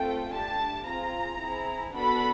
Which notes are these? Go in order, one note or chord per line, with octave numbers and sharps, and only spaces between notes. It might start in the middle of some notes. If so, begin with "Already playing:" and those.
Already playing: A3 C4 F4 A4 G5
A3 D4 G4 A5
C4 F4 G#4 A#5
C4 E4 G#4
B3 D4 F#4 A4 B5